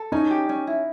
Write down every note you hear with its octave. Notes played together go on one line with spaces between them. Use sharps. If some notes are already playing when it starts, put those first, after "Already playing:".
Already playing: A4
C#4 D#4
G4
C#4
E4